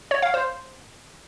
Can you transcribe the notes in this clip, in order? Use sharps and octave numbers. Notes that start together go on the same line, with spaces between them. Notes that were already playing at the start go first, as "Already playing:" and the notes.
C#5
F5
C5